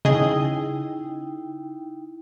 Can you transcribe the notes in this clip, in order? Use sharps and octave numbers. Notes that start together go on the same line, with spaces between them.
C#3 D#4 E4 G#4 D#5 G5